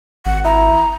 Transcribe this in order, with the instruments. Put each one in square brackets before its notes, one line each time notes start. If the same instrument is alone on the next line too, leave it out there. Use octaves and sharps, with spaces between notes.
[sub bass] G#1 [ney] F#5
[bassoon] E4 [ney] A#5